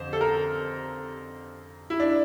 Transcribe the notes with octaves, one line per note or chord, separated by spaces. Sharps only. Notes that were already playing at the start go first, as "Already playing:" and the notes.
Already playing: F2 D3 C5
A4
A#4
E4
D4